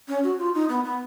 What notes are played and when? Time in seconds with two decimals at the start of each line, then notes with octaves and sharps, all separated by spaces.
0.08 C#4
0.24 F#4
0.39 F4
0.55 D#4
0.69 B3
0.84 B3